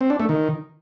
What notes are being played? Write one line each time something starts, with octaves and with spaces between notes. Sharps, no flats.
C4
D4
A3
D#3